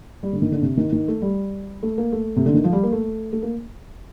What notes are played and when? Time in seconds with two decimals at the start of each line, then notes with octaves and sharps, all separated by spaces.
0.23 G3
0.33 D3
0.42 D#3
0.52 D3
0.62 C3
0.77 D#3
0.92 D#3
1.08 A3
1.22 G3
1.83 A3
1.98 A#3
2.12 A3
2.36 C3
2.46 D3
2.54 D#3
2.64 F3
2.73 G3
2.83 A#3
2.92 A3
3.33 A3
3.42 A#3